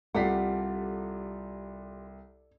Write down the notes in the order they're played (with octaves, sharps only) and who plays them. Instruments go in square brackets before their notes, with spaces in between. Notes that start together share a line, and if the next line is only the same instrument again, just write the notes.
[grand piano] C2 B6 C7 [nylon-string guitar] F4 G4 F#5 [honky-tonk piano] A4 D5